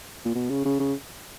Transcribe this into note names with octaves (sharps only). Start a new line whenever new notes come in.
A#2
B2
C#3
C#3
C#3